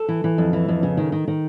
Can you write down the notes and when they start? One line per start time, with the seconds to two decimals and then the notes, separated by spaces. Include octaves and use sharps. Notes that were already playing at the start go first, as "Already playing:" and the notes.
Already playing: A4
0.09 E3
0.24 E3
0.38 F2
0.53 E3
0.68 F2
0.83 C#3
0.97 D#3
1.12 D#3
1.28 D#3